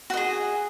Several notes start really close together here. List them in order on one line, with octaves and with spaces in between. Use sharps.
F#4 D#5 G#4